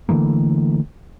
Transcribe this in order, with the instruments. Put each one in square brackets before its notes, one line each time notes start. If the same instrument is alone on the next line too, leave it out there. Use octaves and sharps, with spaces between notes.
[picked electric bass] D3 E3 A3 A#3